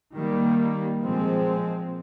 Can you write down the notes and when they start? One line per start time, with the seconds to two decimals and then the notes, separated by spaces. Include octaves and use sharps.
0.15 D#3 G3 A#3
1.02 A#2 F3 G#3 C4